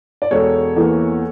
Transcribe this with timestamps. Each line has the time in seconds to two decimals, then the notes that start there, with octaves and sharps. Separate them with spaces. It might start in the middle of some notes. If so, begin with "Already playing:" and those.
0.22 D5
0.31 E1 A4 C#5
0.76 E2 E3 A#3